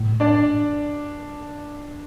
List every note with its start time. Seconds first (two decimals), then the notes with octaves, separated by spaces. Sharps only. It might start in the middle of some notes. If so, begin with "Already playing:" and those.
Already playing: A2
0.20 D4 D5